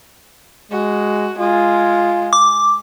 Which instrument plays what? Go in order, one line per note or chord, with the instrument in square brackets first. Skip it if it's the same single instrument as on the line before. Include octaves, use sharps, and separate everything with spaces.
[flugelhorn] G#3 [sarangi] F#4
[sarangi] G#3 [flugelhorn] F4
[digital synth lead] D6